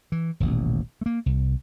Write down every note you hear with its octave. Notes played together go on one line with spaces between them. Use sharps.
E3
D#1 A1 B2
A3 A#3
C2